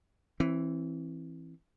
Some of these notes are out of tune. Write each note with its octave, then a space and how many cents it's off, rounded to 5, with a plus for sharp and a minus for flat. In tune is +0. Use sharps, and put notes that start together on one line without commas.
E3 +0 C4 +25